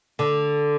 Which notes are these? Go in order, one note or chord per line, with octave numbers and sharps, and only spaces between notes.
D3